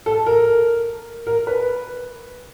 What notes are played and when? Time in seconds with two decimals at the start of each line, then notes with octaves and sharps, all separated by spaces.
0.06 A4
0.26 A#4
1.27 A#4
1.47 B4